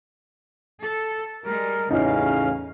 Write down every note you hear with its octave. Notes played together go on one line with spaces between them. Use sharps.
A4
G3 G#3 A#4
A1 E2 C#3 C#4 D#4 E4 F5